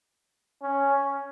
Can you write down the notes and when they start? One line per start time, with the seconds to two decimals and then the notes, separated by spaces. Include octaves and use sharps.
0.62 C#4